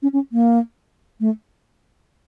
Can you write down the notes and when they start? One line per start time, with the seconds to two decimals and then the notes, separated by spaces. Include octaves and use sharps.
0.02 C#4
0.13 C#4
0.32 A#3
1.20 A3